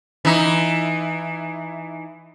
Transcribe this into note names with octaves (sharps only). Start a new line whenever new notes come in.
E3 D#4